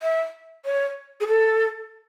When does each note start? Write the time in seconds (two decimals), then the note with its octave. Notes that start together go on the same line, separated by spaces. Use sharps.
0.02 E5
0.65 C#5
1.20 G#4
1.27 A4